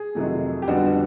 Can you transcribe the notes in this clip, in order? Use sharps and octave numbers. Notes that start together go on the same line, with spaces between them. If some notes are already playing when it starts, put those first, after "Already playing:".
Already playing: G#4
F2 C3 D#3 F#3 A3
G4
F2 D3 G3 B3 D4 F#4
F#4